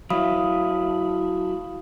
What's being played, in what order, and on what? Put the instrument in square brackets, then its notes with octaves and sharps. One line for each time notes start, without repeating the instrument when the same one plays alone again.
[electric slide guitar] F#3 E4 [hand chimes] F5 B5 D#6